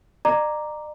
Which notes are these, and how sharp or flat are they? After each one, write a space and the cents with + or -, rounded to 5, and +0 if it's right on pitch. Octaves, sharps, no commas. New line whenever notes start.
D5 +45 A#5 +0 D6 +0